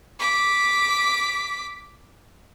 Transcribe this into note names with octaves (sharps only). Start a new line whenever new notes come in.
D6 B6